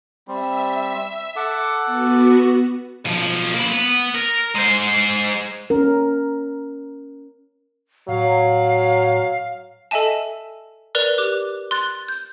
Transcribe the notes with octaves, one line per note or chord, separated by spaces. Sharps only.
G3 C4 E5
A4 F#5 D6
B3 F#4
B1 F3
A#3 B5
B3
A#4
G#3 C5
C#4 A#4
A2 F#3 F5
A4 D#5 E5 G#5 A5
A#4 B4 D5 F#6 F7
G4 D6 F#6
C6 F#6 A6
G6